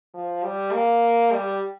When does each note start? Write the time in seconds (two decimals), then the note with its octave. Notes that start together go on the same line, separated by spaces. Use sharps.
0.14 F3
0.43 G3
0.72 A#3
1.33 G3